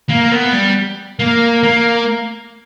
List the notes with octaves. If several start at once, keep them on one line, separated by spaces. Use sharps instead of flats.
A#3
B3
G3
A#3
A#3